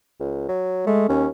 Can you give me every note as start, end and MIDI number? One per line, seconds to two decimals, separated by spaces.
0.20 0.46 37
0.48 0.82 54
0.87 1.07 56
0.87 1.07 57
1.09 1.27 39
1.09 1.27 61